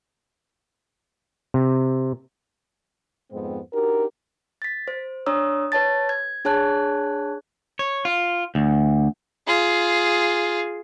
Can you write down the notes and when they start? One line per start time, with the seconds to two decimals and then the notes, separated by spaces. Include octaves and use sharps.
1.54 C3
3.32 F2 G#2 G#3 B3 C4
3.73 D4 D#4 F#4 G4 A#4
4.62 A6 B6
4.88 C5
5.26 D4 C#5 A#5 D#6 E6
5.72 B4 C#5 A5 A6
6.09 G#6
6.45 D4 G#4 C#5 A5 F#6 G#6
7.79 C#5
8.05 F4
8.55 D2
9.47 F4 G#4